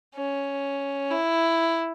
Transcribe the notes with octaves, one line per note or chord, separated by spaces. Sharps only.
C#4
E4